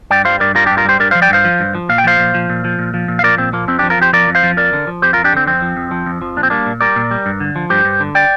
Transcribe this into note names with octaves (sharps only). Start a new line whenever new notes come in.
G2 D5 G5
G3 C5 F5
G2 A#4 D5
G3 F4 A#4
D4 G4
G2
F4 A#4
G3 G4 C5
G2 A#4 D5
C5 F5
F3
D5 G5
G2 C5 F5
F3
G2
F3
A#2 F5
G5
F3 C5 F5
A#2
F3
A#2
F3
A#2
F3
A#2
F5
F3 A#4 D5
A#2 C4
F3 A#3
F2 C4
D4 G4
F3
F4 A#4
F2 G4 C5
F3 A#4 D5
F2
C5 F5
F3
F2 A#4 D5
D3
F3
F2 G4 C5
F4 A#4
F2
D4 G4
D3 C4
F2 C4
F3
F2
F3
F2
F3
A#2 D4
C4
G3 A#3 D4
A#2
G3 A#4 D5
A#2
G3
G2
D3
F3
G2 G4 C5
G2
D3
D5 G5